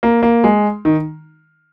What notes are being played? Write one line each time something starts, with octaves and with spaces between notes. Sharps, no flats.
A#3
A#3
G#3
D#3